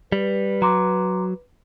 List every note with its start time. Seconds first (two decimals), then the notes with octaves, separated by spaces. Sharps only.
0.12 G3 B4
0.62 F#3 A#5 C6 D6